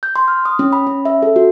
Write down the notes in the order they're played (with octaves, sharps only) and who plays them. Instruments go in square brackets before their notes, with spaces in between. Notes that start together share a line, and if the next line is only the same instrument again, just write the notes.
[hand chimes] G6
C6
F6
D#6
C#4
B5
C#4
E5
A4
F#4